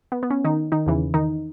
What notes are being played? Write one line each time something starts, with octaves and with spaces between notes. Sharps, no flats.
B3
B3
C#4
D#3 D#4
D#3 D#4
E2 C#3 E3
D#3 D#4